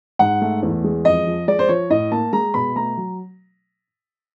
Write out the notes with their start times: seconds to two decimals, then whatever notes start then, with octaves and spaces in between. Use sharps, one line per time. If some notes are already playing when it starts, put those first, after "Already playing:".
0.19 G#2 F#5
0.41 A3
0.63 E2
0.84 G#3
1.05 F2 D#5
1.27 F3
1.48 G#3 D5
1.59 C5
1.69 F3 C#5
1.90 A2 D#5
2.12 A#3 A5
2.33 G#3 A#5
2.54 B2 B5
2.76 A3 A#5
2.97 F#3